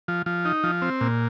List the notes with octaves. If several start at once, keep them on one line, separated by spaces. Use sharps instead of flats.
F3
F3
D#4
F3
C4
A#2